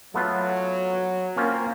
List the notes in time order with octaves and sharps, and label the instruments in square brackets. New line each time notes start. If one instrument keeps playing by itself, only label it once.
[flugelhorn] F#3 [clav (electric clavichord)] A3 B3 F4
[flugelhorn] A#3 [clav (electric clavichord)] C4 C#4 F4